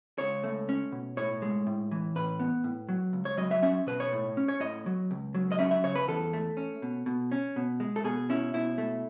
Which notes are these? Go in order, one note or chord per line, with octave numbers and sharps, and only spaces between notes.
C#2 C#5
A3
C#4
B2
A2 C#5
G#3
A2
E3
A2 B4
B3
A2
F#3
C#2
C#5
F#3 D#5
E5
C#4 E5
B2 B4
C#5
A2
C#4
C#5
A2 D#5
F#3
C#2
F#3
D#5
C#4 E5
E5
C#3 C#5
B4
E2 A4
A3
C#4
B2
B2
C#4
B2
G#3
A4
B2 G#4
C#4 E4
B2 E4
A3